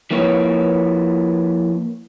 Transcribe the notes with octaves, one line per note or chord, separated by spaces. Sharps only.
F3 A#3 E4 B4 C#5